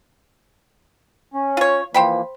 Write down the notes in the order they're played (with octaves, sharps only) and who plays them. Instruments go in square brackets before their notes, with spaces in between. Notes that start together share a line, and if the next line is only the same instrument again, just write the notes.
[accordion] C#4
[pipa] F4 C#5
[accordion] E3 F3 A#3 [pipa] C5 G5 B5